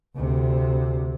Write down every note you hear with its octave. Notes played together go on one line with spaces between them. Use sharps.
D2 C3